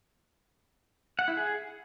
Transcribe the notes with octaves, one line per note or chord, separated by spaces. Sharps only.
F#5
E4
G#4